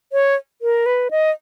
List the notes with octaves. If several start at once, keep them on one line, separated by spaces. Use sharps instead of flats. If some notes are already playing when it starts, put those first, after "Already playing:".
C#5
A#4
B4
D#5